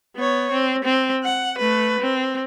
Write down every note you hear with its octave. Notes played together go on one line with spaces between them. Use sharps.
B3 C#5
C4
C4
F#5
A3 B4
C4